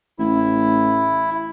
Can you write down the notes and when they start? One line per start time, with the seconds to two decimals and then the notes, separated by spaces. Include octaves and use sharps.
0.19 A1 E4